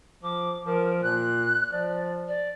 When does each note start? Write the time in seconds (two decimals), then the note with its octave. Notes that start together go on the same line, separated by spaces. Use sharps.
0.23 F3 D6
0.66 F3 A#4
1.03 A#2 F#6
1.72 F3 D5
2.28 D5